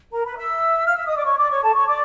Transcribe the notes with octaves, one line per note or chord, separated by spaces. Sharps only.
A#4 A#5
B4 B5
E5 E6
F5 F6
E5 E6
D#5 D#6
D5 D6
C#5 C#6
D5 D6
C#5 C#6
A4 A5
C#5 C#6
D5 D6